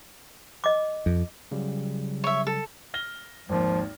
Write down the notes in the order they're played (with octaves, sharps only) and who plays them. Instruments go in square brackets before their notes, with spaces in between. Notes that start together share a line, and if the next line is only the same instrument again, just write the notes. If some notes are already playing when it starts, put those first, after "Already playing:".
[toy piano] D#5 D6
[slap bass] F2
[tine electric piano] C#3 F#3 G3
[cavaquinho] C#5 E5
A4
[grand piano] F6 A#6 G7
[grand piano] G#1 D#2 [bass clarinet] F3